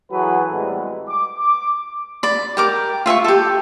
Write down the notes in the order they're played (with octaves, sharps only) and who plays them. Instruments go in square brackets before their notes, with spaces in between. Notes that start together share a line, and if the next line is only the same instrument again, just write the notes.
[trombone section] E3 F#3 F#4 G#4 A4 B4
A2 E3 G3 G#3 B3 C4
[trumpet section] D6
D6
[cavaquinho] D5 B5
G4 A#4 D6
F4 E5 G#5 C#6
G4 A4